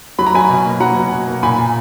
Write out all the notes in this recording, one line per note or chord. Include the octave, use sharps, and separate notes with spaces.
F#3 B5
A#5
F#3 G#5 B5
B2
A#3
F#3 F#5 A#5
B2
B2
A#3
A#2 G#5 B5
A#2